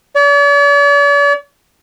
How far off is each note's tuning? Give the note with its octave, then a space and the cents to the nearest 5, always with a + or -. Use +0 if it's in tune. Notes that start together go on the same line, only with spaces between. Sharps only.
D5 -45